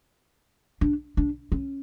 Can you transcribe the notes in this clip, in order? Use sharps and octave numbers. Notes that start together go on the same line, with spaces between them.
D4
D4
C#4